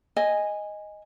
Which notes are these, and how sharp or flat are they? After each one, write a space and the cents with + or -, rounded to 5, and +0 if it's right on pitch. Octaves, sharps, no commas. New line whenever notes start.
D#5 +0 G#5 -10